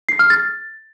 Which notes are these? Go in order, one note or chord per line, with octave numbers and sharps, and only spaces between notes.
C7
F6
A6